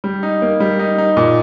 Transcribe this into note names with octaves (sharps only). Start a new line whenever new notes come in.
G3
D#4
A#3
G3
D#4
D#4
A#2